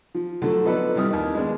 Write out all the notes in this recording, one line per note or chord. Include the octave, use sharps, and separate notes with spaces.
F3
D3 F3 F#3 A3
F3 B3 D#4 A4 B4 D5
A2 C3 G3 E4 D#6 F6
D#2 D#3
G#3 B3 D4